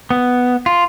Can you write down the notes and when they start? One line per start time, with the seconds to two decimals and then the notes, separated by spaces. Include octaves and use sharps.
0.10 B3
0.66 F4